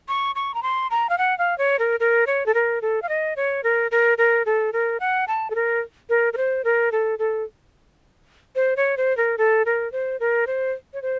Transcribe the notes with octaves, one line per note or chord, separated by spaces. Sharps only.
C#6
C#6
A#5
C6
A#5
F5
F#5
F5
C#5
A#4
A#4
C#5
A4
A#4
A4
F5
D#5
C#5
A#4
A#4
A#4
A4
A#4
F#5
A5
A4
A#4
A#4
A#4
C5
A#4
A4
A4
C5
C#5
C5
A#4
A4
A#4
C5
A#4
C5
C#5
C5